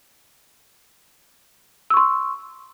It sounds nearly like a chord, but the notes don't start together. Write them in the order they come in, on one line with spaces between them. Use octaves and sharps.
E6 C#6 C6